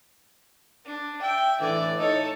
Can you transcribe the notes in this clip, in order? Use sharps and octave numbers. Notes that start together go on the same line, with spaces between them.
D4
E5 G5
A2 D3 E3 D5
A2 D#4 A4 C#5